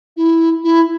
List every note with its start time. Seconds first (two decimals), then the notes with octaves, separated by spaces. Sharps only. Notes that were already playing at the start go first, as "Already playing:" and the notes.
0.17 E4
0.64 E4